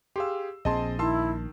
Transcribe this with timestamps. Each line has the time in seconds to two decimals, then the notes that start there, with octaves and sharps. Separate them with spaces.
0.16 G4 G#4 F5 C6 E6
0.65 A#1 C4 G#4 D#5 A5 C6
0.99 D#3 E4 A5 C6 E6